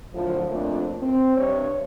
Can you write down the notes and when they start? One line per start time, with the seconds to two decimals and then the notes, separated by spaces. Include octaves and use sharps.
0.13 F#2 A2 D3 F3
0.48 F2 A#2 A3 A#3 C#4 D4
1.01 C4
1.36 G2 C3 D4 C#5